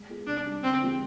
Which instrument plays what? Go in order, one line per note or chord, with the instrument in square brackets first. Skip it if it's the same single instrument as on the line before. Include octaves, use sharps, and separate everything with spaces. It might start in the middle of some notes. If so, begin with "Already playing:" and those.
Already playing: [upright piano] G#3
B3 F4 G#4
[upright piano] C3 [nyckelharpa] D4
[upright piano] G3 D4
[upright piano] D3 [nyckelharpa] C4
[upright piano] F3 G#3 C4 G4